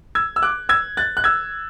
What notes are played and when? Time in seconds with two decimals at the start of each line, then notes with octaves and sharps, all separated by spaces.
0.15 E6 G#6
0.36 E6
0.42 D6 F#6
0.69 E6 G#6
0.97 F#6 A6
1.17 F#6
1.24 E6 G#6